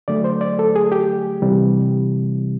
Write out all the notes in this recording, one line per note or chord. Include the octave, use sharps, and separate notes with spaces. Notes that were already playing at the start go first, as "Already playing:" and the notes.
D3 F#3 A3 D5
C5
D5
A4
G#4
G4
C3 E3 G3